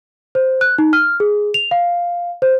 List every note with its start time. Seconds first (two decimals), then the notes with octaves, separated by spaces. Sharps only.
0.35 C5
0.61 F#6
0.78 D#4
0.93 F6
1.20 G#4
1.54 F7
1.71 F5
2.42 C5